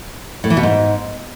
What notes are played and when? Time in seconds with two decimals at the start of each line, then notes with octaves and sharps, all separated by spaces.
0.44 A2
0.50 E3
0.57 B2
0.63 G#2